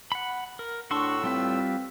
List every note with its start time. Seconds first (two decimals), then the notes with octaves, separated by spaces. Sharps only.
0.12 F#5 B5
0.59 A#4
0.91 A2 D4 F#4 C6 C#6 E6
1.23 G3 C4 F4 B4